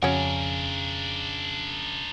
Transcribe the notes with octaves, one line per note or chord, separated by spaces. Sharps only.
F2 C#3 C#4 D4 F#4 A#4